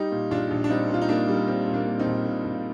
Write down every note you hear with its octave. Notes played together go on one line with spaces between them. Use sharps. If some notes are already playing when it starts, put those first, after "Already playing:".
Already playing: G3 D#4 G4
A#2
A#1 D4 F4
A#1
D4
G3 C4 D#4
A#2 F4
D#4
G3 A#3 D4
G3
A#3
A#2 C4
A#2
A#3 D4
A#2
C4 D#4
A#1
A#2
A#1